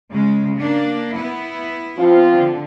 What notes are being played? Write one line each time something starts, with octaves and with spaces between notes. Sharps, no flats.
C#3 G#3
A#3 D4
B3 E4
F3 C4 F4
D3